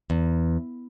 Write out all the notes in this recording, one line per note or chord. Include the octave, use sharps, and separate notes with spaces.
E2